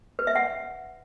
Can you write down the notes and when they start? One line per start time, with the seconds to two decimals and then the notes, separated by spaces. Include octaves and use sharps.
0.19 B4
0.27 E5
0.36 F#5